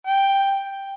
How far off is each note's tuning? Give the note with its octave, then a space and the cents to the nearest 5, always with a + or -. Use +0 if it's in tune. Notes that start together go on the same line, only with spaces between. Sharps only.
G5 +5